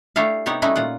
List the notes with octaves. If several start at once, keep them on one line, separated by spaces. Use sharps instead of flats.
A3 D4 E4 G4 A4 F5
C3 B3 D#4 G4 C#5 F#5
G3 A3 C#4 D#4 E4 F#4
A#2 F4 F#5